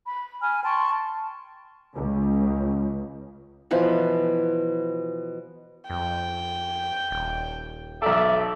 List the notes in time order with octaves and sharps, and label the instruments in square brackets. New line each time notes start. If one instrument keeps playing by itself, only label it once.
[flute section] B5
G#5 B5 F6
G5 A5 C6 C#6
[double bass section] C#2
[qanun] B2 E3 F3 B4
[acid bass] F2 [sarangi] G5
[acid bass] D#1
[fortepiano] B1 A4 [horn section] D5 E5